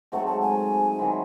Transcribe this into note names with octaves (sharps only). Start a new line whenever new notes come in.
G#2 F#3 A3 C4 F#5
A5
G#5
D#3 F#3 C4 E4